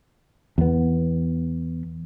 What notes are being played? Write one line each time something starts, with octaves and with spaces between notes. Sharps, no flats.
E2 B3